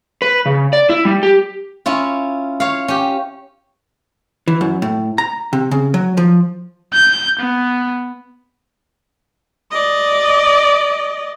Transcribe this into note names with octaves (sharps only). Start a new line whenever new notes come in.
B4
C#3
D5
E4
G3
G4
C#4 E4 F4
C#5 F5
C#4 G4
E3
F#2
A2
A#5
C3
C#3
F#3
F3
G6
B3
D5 D#5